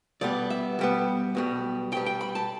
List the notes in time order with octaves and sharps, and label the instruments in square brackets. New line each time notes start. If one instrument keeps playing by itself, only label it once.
[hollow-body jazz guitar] B2 G3 B3 D5
E5
B2 G3 B3
B1 B2 G3
B1 B2 G3 G5
G5
B5
A5